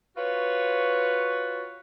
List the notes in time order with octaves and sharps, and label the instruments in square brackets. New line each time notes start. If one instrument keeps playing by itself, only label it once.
[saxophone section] F4 F#4 B4 C#5